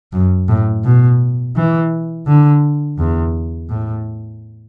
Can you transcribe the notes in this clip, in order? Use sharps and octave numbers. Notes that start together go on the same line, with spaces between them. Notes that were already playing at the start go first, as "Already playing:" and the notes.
F#2
A2
B2
E3
D3
E2
A2